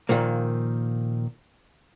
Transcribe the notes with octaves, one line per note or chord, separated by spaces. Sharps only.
A#2 D#3 F3 A#3